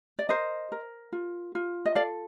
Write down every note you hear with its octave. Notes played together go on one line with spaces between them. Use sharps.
D5
A#4 C5 D#5
A#4
F4
F4
D#5
A4 D5 F5